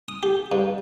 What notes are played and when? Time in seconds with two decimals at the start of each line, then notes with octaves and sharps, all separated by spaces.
0.08 D#6
0.23 G4
0.52 G2